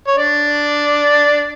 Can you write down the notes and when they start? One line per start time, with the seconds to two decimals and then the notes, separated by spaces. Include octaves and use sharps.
0.07 C#5
0.16 D4 D5